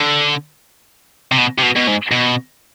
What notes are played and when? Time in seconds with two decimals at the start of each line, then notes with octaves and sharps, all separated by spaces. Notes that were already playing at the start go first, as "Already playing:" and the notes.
Already playing: D3
1.32 C3
1.38 B2
1.58 C3
1.62 B2
1.76 B2
1.87 G#2
2.11 B2